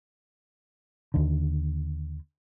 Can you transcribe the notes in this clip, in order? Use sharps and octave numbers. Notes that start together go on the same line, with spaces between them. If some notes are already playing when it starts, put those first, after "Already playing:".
D#2 D3